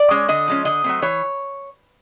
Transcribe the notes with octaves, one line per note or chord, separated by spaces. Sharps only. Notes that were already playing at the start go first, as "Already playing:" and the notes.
Already playing: D5
G#3 C#4
D3 D#5
F3 G#3 C#4
D3 D#5
F#3 A3 C4
E3 C#5